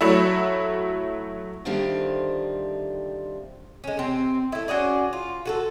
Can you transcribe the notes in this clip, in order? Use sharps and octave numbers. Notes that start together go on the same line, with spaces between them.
F#3 A3 E4
D3 D#3 F3 G3 A3 C4
G#3 C#4
C3 C4
A3 E4
C#4 F#4 G#4 D5
F4
F#4 G#4 A4